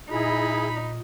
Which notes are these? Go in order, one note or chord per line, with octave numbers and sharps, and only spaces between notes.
A#2 D#4 E4 G#4 B5